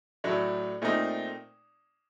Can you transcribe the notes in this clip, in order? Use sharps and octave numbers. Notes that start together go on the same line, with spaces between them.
A2 F#3 A3 D4
A#2 A3 C4 D#4